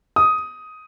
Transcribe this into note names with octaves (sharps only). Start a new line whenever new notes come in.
D#6